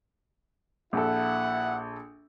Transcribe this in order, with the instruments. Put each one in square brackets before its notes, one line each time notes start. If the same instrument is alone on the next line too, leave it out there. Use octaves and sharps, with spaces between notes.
[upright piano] A#1 A4 [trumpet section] E4 F#5